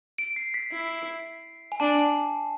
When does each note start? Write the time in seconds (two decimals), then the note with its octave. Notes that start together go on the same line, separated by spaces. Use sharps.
0.18 D7
0.36 C7
0.54 B6
0.72 E4
1.72 G#5
1.80 D4 A5